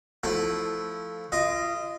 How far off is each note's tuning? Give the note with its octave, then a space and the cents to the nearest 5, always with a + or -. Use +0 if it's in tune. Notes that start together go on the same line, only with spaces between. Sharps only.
F3 +0 A3 +0 E4 -5
F4 -35 D#5 +0